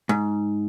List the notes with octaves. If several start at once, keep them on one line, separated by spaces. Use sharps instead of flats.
G#2